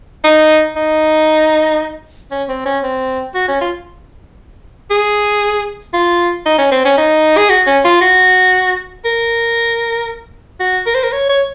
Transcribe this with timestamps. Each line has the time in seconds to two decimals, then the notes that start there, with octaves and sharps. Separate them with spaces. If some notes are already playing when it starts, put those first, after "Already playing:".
0.24 D#4
0.76 D#4
2.31 C#4
2.49 C4
2.65 C#4
2.83 C4
3.35 F#4
3.48 C#4
3.61 F4
4.90 G#4
5.94 F4
6.46 D#4
6.58 C#4
6.71 C4
6.85 C#4
6.98 D#4
7.37 G#4
7.50 F#4
7.67 C#4
7.84 F4
8.01 F#4
9.05 A#4
10.60 F#4
10.86 A#4
10.95 C5
11.03 A#4
11.12 C#5
11.29 C#5